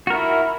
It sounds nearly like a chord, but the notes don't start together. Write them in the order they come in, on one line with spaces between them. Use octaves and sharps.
F#4 A#4 E4